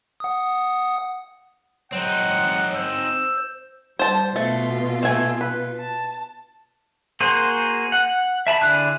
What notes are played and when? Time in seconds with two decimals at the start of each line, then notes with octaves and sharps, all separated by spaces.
0.20 F#5 D#6
1.92 F#3 C4 D#4 F#5
2.76 C5 E6
3.99 G3 C5 A5
4.36 B2 A3 F4
5.03 A3 G#5
5.41 B4
5.78 A5
7.20 A#3 F#4 G#4 C5
7.92 F#5
8.47 E5 A5 B5
8.61 D3 D4 E4 G#4 F#6